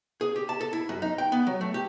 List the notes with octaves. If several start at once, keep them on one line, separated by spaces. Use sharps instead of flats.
G#4
G4
A5
A4
E4
F#2
D#4
G5
B3
F#3
A3
G4